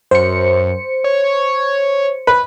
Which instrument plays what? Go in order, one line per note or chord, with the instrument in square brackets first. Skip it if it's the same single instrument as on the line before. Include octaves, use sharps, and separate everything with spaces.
[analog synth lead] F#2 [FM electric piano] C5 C#7
[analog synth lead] C#5
[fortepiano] B4